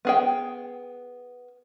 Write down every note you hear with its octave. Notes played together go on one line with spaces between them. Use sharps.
B3 G#4 G5